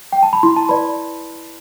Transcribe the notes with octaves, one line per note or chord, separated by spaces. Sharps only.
G5
A5
B5
E4 C6
A5
B4 D5 B5